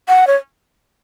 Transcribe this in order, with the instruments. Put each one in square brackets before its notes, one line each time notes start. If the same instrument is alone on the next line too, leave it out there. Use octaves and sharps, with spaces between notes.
[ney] F#5
C#5